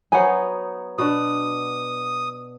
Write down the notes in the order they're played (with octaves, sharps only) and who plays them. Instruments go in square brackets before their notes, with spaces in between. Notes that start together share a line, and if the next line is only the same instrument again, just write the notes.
[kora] F#3 B3 D#4 [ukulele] C5 F#5 G#5
[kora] B2 D4 [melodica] D#6